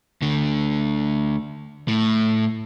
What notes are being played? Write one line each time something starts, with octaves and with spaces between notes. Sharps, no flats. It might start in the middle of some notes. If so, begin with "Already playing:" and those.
D2 D3
A2